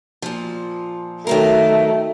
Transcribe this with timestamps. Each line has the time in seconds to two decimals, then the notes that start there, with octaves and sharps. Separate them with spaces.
0.22 A#2 F3
1.27 D#3 F#3 A3 A#4